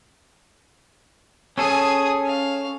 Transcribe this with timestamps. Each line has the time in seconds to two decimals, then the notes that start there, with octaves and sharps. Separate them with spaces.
1.58 C#4 G#4 A4 D#6
2.26 F5